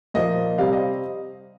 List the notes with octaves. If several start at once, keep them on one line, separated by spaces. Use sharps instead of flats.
A#2 F3 A#3 D#5
C3 G3 C4 F5
D#5